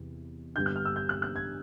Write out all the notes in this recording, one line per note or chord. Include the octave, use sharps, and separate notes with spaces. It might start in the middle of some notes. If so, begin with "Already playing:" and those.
Already playing: E2 C3
G2 D3 G3 B3 G6
F#6
F6
E6
G6
F#6
F#6
G#6